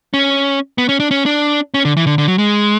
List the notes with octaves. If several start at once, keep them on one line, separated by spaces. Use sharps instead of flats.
C#4
B3
C#4
D4
C#4
D4
C#4
D3
E3
D3
D3
F#3
G#3